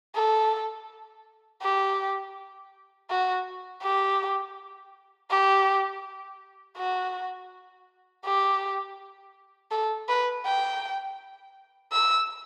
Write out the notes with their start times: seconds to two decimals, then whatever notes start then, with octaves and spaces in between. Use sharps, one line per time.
0.15 A4
1.62 G4
3.10 F#4
3.83 G4
5.31 G4
6.77 F#4
8.25 G4
9.71 A4
10.09 B4
10.45 G5
11.92 E6